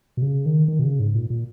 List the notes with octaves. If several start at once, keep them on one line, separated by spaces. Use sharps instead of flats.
B2
C#3
D#3
D#3
B2
C#3
G#2
A#2
A#2